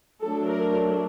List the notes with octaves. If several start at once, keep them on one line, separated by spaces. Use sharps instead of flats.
F#3 A3 D4 A4
A#4